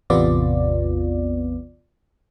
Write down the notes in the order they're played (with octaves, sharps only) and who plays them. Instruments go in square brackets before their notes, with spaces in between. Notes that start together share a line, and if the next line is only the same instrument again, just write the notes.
[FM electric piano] A1 E2 C3 B3 F4 D5